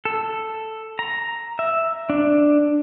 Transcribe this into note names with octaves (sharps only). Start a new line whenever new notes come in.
A4
A#5
E5
D4